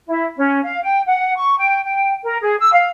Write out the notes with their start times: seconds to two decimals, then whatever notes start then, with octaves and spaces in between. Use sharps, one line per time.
0.07 E4
0.36 C#4
0.63 F5
0.82 G5
1.06 F#5
1.36 C#6
1.58 G5
1.84 G5
2.24 A#4
2.42 G#4
2.59 E6
2.72 F5